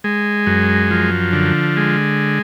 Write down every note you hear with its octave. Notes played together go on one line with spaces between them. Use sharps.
G#3
F#2
F3
D3
G#3